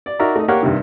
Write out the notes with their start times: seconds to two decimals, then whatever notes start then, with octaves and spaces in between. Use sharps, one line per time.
0.06 D5
0.19 D#4 F#4 A#4 D5 E5 A#5
0.36 A3 D#4 D#5
0.48 A#3 G4 A#4 C#5 F5 F#5
0.63 G2 C3 D#3